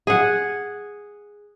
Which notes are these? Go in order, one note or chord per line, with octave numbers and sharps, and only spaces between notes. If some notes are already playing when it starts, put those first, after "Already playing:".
G#4 F#5